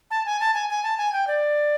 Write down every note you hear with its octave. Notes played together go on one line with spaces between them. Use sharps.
A5
G#5
A5
G#5
G#5
A5
G#5
G5
D5